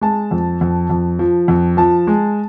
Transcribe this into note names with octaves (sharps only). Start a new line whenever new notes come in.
G#3 A5
F2
F2
F2
F3
F2
F3 A5
G#3